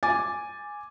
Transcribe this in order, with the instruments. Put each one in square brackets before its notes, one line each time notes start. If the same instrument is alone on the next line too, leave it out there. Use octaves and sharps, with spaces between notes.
[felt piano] G#5 D6 A6